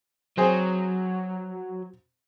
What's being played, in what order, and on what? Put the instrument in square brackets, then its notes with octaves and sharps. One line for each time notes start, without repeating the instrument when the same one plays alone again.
[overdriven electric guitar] F#3 [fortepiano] C4 G#4 C5